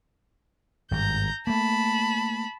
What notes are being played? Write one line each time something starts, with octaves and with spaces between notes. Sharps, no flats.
G#1 G2 A#5 G6
A3 A#3 A5 B5